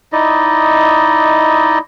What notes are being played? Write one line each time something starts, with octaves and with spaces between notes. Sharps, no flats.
D#4 E4 D5 D#5